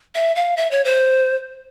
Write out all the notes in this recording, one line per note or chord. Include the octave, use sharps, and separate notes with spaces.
E5
F5
E5
C#5
C5